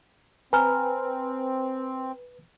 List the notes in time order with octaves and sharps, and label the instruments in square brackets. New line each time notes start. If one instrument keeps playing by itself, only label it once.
[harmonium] C4 [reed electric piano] B4 [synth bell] G#5 A#5 F6